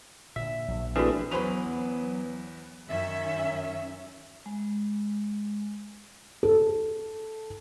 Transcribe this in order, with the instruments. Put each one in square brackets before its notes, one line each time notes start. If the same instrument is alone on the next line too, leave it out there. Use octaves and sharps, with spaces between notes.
[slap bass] A#2 D3 [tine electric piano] E5
[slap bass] A#1 F#3
[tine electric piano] E3 A3 G#4 [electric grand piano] C4 D4 [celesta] F#4 B4
[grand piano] E2 B4 F7 [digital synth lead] F#3 [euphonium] B3 [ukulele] C#4 C5 B5
[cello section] F#2 D#3 C#4 E5
[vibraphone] G#3
[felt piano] A4